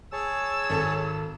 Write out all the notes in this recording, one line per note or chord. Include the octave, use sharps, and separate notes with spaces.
G#4 C#5 A5 E6
G#1 A4